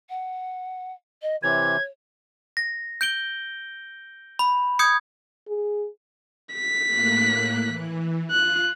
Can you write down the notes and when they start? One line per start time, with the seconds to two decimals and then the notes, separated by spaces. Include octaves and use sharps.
0.09 F#5
1.22 D#5
1.43 C3 E3 C#5 G#6
2.57 A#6
3.01 G6 D7 G7
4.39 B5
4.79 D#6 G6 G#6 C#7
5.48 G#4
6.54 B6
6.87 A2 A#3 F#6
7.66 E3
8.31 F4 F#6